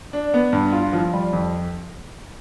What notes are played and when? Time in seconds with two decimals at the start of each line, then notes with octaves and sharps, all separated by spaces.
0.13 D4
0.34 B3
0.52 G2
0.72 F4
0.93 F3
1.13 G3
1.33 F2